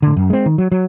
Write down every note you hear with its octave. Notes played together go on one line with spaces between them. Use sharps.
A2 D3
F#2
G#3 C4
D#3
F#3
F#3